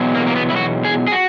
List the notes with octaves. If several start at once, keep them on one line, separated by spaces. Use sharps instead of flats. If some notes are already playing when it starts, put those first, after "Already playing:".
Already playing: E2 B2 F#3
A#3
A#3
B3
E4
F#4
G#4
G#4
F#4